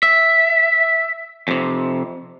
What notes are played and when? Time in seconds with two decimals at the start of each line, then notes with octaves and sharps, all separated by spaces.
0.03 E5
1.48 F2 C3